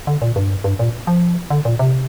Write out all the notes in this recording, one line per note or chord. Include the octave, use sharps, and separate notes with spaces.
D3
A#2
G2
G2
A#2
F3
D3
A#2
C3